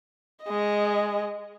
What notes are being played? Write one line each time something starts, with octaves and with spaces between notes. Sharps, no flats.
G#3 D#5